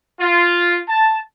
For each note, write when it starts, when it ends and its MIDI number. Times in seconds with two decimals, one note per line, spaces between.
0.20 0.80 65
0.88 1.19 81